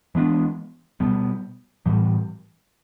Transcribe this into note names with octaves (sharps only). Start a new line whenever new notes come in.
E3 G#3 B3 D4
B2 G3 B3
A2 E3 G3